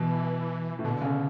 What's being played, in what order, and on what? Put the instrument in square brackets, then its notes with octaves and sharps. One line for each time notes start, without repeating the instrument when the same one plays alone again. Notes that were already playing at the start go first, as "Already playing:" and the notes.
Already playing: [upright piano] B2 [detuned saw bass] E3
[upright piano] A2
[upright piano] B2 [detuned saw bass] D3
[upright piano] C#3